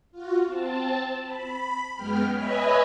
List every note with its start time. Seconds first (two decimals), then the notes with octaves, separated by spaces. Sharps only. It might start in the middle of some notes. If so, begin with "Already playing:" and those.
0.12 F4 F#4
0.47 C4 A5
1.25 B5
1.95 F#2 G#3 B3 G5 F6
2.34 B4 C#5 D#5 E5 G#5 B5